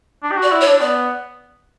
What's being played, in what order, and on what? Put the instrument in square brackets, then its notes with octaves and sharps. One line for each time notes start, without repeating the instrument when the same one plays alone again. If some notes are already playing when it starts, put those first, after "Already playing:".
[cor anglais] D4
G4
F#4
[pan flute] D5
[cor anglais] E4
[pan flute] C#5
[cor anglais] D4
[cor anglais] B3 [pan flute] D5